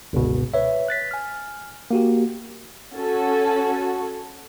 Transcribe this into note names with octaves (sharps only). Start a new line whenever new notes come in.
G1 C#2 B2
B4 C#5 E5
F#6 A6 B6
G#5 F6
A#3 F#4 G4
C#4 F#4 A4